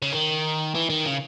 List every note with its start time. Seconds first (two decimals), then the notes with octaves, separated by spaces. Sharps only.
0.02 C#3
0.12 D#3
0.75 E3
0.90 D#3
1.05 C#3